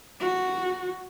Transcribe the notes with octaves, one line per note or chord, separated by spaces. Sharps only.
F#4